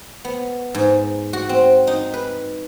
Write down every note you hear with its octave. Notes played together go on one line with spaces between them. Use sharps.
B3
G#2
F#4
C4
D#4
B4